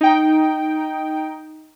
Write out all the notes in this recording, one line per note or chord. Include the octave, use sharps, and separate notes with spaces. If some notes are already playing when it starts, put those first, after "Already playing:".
D#4 G5